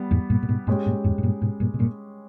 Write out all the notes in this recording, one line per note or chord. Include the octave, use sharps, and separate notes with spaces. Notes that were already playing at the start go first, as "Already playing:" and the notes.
Already playing: G3 B3
E2 G#2
G2 A#2
A#2
G#2 B2
G2 A#2 G#3 C#4 G4
G2 A#2
E2 G#2
G#2
G2 A#2
G#2 B2
G2 A#2
B2
G2 A#2